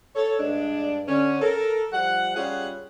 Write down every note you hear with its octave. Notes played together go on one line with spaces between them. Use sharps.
A4 C#5
G2 G#3 D4
D3 C#4
A4 A#4
F3 G3 F#5
G3 C#4 F4 G#4 F#5